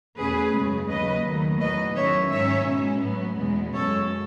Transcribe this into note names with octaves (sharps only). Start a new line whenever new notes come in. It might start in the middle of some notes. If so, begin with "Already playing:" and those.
E2 B2 A3 C#4 G#4 B4
F#2 C#3 G#3 C#4
D#2 C#3 F#3 B4 D#5
D#2 D#3 F#3 A3
E2 B2 F#3 B4 D#5
E2 D#3 F#3 C#4 C#5 E5
G#2 F#3 C#4 C#5 E5
B2 G#3 C#4
A2 F#3 B3
E2 B2 G#3 B3
F#2 C#3 G#3 A4 C#5